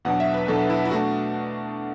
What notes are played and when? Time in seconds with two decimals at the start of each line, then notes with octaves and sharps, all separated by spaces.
0.05 E2 B2 F#3 D4 F#5
0.20 E5
0.34 B4
0.48 E2 B2 F#3 D4 A4
0.70 E4
0.85 E4
0.91 B2 A3 D4 F#4